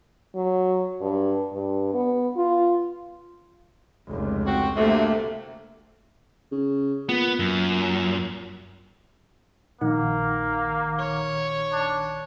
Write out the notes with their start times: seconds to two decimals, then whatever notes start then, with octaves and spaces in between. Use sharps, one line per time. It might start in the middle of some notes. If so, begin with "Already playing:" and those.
0.35 F#3
1.01 G2
1.53 G2
1.94 B3
2.36 F4
4.07 F1 C#2
4.46 C4 F#4
4.76 D2 C3 A3 A#3
6.52 C#3
7.09 A#2 B3
7.39 F#2
9.81 A#1 D#3 A#3 F#5
10.99 C#5
11.72 D4